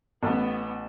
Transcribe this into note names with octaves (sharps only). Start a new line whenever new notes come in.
A1 B3